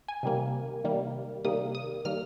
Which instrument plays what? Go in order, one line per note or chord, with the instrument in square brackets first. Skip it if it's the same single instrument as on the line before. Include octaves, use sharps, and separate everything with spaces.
[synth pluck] G#5
C3 D#3 G3 A#3
C3 D#3 G3 A#3
C3 D#3 G3 A#3 D#6
D#6
D#3 G3 A#3 F6